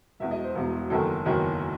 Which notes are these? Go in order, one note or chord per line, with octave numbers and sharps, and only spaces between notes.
E1 E2 B2 E5
D#5
C5
E1 E2 B2
F#1 E2 D#3 F#3 A4
F#1 E2 D#3 F#3